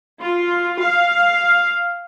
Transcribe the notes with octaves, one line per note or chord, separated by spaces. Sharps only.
F4
F5